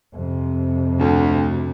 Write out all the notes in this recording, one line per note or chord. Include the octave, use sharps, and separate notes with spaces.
F2 C3
D2